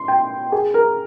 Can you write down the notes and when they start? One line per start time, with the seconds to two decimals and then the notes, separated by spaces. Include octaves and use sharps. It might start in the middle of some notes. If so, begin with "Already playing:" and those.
Already playing: C6
0.08 G5
0.52 G#4
0.74 A#4